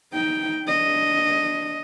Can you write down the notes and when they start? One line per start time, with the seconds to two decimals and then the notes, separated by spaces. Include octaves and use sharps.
0.13 D#4 G5
0.65 D4 D#5